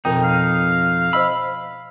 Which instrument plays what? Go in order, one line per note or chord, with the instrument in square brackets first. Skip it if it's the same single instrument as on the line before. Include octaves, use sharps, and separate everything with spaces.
[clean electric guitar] F2 D#4 [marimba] B2 A#4 G5
[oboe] F5
[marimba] C5 D#5 E6 [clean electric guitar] B5